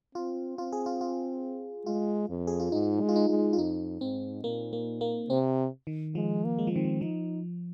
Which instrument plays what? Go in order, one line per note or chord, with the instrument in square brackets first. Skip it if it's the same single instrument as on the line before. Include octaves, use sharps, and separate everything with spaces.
[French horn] C4 [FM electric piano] F4
[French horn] C4 [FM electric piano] F4
[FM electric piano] G#4
F4
F4
[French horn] G#3 [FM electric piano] F4
[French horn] F2
[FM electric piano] G#4
F4
[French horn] G#2 [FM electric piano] D#4
[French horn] G#3
[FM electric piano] F4
D#4
[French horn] G#3
[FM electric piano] F4
[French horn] F2 [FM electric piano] D#4
[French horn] G#2 [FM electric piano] C4
[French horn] A#2 [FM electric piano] A#3
[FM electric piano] A#3
A#3
[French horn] C3 [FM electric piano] C4
[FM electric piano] D#3
[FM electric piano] F3 [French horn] G#3
[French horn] A#3
[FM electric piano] G#3
F3
[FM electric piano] D#3 [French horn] C4
[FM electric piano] F3
[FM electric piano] F3 [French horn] D#4